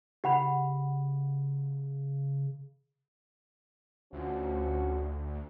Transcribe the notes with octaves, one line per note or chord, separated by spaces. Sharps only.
C#3 G4 F#5 B5
D2 F3 C#4 F#4